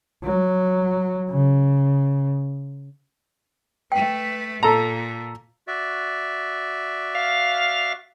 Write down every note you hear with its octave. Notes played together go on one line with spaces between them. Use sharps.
F#3
C#3
A3 B4 G5
A#2 A4 A#5
F#4 D5 E5
F5